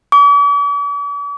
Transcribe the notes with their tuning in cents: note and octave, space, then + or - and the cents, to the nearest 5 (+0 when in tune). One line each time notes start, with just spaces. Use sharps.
D6 -45